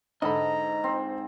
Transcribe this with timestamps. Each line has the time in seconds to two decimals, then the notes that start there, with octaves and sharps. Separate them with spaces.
0.22 G#2 D3 A4 D#5 A#5 B5
0.84 C4